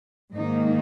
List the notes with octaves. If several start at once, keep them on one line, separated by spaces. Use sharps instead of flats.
G#2 D#3 A#3 D#4